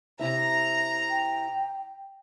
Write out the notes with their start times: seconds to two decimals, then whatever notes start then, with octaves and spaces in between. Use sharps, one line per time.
0.19 C3 E4 E5 A#5
1.10 G5